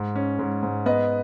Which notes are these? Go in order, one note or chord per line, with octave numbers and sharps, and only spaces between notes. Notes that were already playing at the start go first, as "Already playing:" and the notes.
Already playing: G#2
C#4
G#2
G#2
B3 B4 D#5